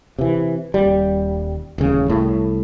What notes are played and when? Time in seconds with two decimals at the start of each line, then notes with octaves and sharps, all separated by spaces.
0.19 C3 E3
0.74 D#1 G3
1.78 D#1 A1 C#3
2.09 C2 A2